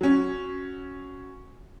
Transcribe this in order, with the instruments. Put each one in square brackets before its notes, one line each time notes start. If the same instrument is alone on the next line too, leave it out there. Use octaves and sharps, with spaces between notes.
[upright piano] F#3 C#4